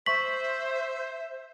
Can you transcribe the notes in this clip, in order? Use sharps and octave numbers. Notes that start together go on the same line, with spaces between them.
C5 E5 C#6 B6 F#7